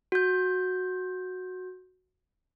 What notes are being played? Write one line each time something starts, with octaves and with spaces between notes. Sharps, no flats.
F#4 G6